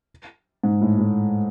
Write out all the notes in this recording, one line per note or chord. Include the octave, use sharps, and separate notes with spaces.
G#2
A2
A2